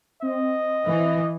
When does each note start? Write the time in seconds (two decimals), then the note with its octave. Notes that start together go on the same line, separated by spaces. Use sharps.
0.22 C4 D#5
0.85 E3